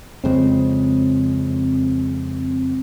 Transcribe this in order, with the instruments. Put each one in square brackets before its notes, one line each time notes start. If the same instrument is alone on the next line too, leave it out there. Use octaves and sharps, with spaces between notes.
[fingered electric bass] F2 C#3 G#3 [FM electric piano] C4